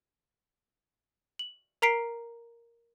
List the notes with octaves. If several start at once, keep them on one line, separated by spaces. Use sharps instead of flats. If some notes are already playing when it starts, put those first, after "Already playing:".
F#7
A#4 A#5 B6 C7 D7